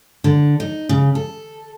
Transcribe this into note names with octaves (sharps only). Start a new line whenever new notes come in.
D3
D#4
C#3
A4